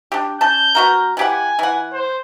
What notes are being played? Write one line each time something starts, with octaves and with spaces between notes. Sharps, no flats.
D4 G4
C#4 A5 G6
B3 F#4 A#4
E3 G4 F#5 G#5
E3 F#5
C5